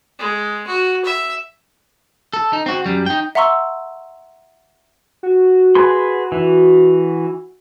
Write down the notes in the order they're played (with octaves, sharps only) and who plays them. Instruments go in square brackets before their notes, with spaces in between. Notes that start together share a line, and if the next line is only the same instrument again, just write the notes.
[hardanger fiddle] G#3
F#4
E5
[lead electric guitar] A4
D#4
C4 F#4
F#2 G3
D#4 G5
[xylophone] E5 F#5 A#5 C6 C#6 E6
[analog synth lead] F#4
[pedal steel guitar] G#4 B4 C6
E3